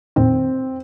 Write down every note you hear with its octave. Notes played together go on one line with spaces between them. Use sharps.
F2 A#2 D#3 C4